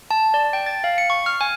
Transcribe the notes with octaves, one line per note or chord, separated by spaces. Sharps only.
A5
D5
G5
A6
F5
C#7
C#6
F6
G#5